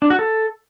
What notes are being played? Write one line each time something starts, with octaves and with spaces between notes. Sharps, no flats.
D4
F#4
A4